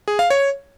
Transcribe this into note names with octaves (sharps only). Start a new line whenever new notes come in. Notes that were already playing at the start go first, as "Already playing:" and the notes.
G#4
F5
C#5